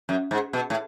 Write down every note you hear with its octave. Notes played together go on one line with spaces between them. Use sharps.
F#2
G#2
B2
A2